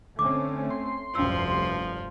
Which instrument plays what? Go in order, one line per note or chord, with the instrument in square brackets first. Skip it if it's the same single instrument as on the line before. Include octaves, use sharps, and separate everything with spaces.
[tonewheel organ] D3 [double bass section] A3 C4 C#4 [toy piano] D6
[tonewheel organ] C6
[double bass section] F1 D2 G2 [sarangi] F3 [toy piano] C#4 E6